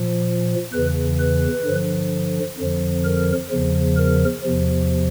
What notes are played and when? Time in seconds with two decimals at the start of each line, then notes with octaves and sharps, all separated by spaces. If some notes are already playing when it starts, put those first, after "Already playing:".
Already playing: A#2 F3
0.73 E2 C#3 E3 B4
1.20 B4
1.65 G2 D3 F3
2.58 F2 D3 F3
3.05 A#4
3.50 E2 C#3 F3
3.97 A#4
4.43 E2 C3 F3